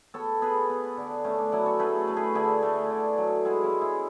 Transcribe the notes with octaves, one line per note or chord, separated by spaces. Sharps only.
B3 A4 C#5
B3 G#4 B4
B3
D3
A3 C#4
D4
F#3 C#4 E4
A4 C#5
A3 G#4 B4
A3
G#4 B4
D3 E4 G#4
A3
D3
F#3
G#3 E4 G#4
C#4 E4
G#3
C#4 E4